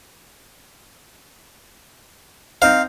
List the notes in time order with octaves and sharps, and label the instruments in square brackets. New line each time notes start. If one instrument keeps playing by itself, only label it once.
[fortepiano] C4 D#4 C5 [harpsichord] F5